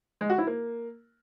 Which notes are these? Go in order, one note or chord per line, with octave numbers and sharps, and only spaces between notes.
G#3
F#4
E4
A#3